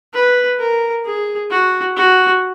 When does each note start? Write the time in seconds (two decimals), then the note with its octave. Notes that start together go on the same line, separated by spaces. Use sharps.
0.14 B4
0.60 A#4
1.05 G#4
1.50 F#4
1.97 F#4